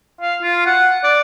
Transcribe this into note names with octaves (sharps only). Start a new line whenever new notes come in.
F5
F4
F#5
D5